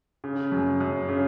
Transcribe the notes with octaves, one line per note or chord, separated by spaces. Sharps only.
C#3
F#2
F#2
C#3